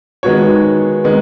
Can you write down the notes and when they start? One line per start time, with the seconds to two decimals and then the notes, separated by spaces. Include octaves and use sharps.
0.23 D#3 G#3 B3 F#4 C#5
1.04 D#3 G#3 B3